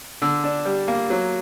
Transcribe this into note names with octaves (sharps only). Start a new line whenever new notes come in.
D3
D4
G3
A#3
F#3